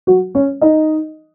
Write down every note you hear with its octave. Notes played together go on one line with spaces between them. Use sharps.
F#3 F#4
C#4 C#5
D#4 D#5